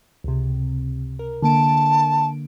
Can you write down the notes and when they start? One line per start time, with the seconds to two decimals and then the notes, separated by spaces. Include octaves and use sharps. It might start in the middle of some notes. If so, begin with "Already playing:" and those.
0.24 C#2 C3
1.19 A#4
1.43 D3 A#3 A5 D7